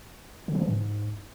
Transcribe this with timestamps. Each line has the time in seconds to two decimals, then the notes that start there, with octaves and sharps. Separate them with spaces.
0.48 D3
0.55 F3
0.62 E3
0.69 G#2